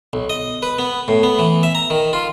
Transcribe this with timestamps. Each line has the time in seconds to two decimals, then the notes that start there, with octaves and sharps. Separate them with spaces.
0.13 B1
0.30 D#5
0.63 B4
0.79 B3
1.08 A2
1.23 B3
1.39 E3
1.63 E5
1.75 A#5
1.90 D#3
2.13 F4